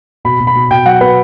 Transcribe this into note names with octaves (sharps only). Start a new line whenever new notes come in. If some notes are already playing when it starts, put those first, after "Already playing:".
B2 B5
B2
B5
B2
B2 G5
F#3 F#5
B2 B4